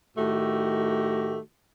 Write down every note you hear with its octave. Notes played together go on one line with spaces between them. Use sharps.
A2 D#3 A3 F#4 G4